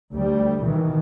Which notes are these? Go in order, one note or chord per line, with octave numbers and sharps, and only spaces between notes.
D2 G3
B2 D#3 E3